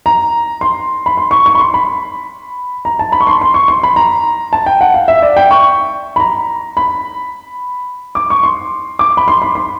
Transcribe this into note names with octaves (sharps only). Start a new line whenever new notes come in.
A#5
C6
B5
C6
C#6
C#6
B5
C6
B5
A#5
A5
B5
C#6
C6
C6
C#6
C6
B5
A#5
A5
G5
F#5
F5
E5
D5
G5
C#6
B5
A#5
B5
D6
C#6
C6
D6
B5
C6
B5
C6